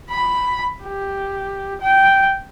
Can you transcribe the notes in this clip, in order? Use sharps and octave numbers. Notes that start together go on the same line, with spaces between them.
B5
G4
G5